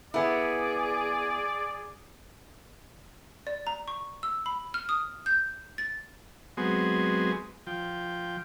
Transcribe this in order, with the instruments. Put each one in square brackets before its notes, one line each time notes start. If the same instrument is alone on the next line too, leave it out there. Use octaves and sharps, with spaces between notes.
[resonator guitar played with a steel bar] B3 E4 [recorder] G#4 [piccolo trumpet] D5
[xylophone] D5
A#5
C#6
E6
B5
F6
D#6
G6
A6
[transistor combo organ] F#3 G#3 B3 C4 G#4
F3 G5